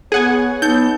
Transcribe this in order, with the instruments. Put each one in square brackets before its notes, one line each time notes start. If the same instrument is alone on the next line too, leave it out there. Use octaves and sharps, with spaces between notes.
[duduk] B3 [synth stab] G#4 F#5 G#5 [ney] C#5
[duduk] B3 [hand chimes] D#4 [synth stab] G6